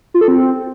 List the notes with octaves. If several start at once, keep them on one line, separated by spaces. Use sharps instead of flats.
F4
A4
C4